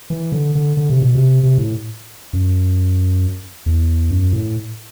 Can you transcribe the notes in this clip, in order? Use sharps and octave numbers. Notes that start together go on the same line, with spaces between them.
E3
D3
D3
D3
C3
B2
C3
C3
A2
F#2
E2
F#2
A2